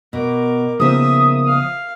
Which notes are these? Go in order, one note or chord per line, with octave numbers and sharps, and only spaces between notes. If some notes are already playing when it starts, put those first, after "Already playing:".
B2 A#4 D6
C#3 F3 A#3 B3 D#4 E5 D#6
F5